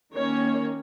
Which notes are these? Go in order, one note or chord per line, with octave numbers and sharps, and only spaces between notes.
D#3 A#3 C#4 C#5